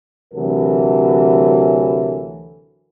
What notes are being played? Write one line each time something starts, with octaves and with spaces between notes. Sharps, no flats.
D2 C3 E3 F#3 A4 A#4